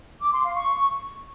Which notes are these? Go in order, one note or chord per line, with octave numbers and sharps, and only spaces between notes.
D6
C6
F5
C#6